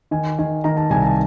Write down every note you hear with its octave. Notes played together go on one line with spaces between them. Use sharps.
D#3 G#5
D#3 G#5
D#3 A#5
A5
C2 G#5
A5